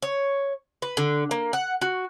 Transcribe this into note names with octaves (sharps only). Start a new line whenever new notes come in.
C#5
B4
D3
A#3
F#5
F#4